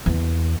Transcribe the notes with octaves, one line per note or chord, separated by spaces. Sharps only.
E2